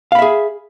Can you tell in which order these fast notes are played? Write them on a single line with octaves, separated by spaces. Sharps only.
F5 B5 E5 G#4